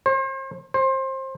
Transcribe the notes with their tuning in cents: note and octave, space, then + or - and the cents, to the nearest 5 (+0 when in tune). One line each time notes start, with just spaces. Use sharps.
C5 +40
C5 +25